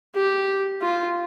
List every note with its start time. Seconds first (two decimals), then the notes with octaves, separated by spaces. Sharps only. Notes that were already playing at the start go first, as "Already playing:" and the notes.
0.15 G4
0.82 F4